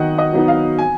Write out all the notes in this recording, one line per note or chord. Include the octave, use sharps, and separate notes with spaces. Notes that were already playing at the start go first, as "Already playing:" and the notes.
Already playing: D#3 F#3 B3 D#5 F#5
D#5
F#3 B3 D#4
F5
G#5